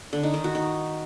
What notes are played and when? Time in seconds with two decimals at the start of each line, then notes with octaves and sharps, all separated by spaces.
0.13 D3
0.23 D#4
0.34 D#3
0.44 F#4
0.55 D#4